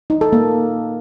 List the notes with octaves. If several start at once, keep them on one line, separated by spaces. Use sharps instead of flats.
D#4
A4
A#3